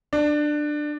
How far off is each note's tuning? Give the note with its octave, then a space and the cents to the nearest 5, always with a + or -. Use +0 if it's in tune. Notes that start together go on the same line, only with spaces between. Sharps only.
D4 +15